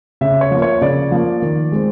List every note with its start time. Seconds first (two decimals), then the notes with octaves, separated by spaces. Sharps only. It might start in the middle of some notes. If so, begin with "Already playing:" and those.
0.21 C#3 E5
0.41 C#5
0.51 F3 A#3
0.62 C#5
0.81 C#3 D5
1.11 F3 A#3
1.42 D#3
1.72 G#3 C4